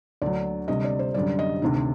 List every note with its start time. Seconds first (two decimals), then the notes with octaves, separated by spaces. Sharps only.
0.22 D2 D3 F#3 D5
0.68 D2 C3 G3 D#5
0.84 D5
0.99 C5
1.14 F#2 D3 G3 D5
1.39 D#5
1.62 D2 C3 D#3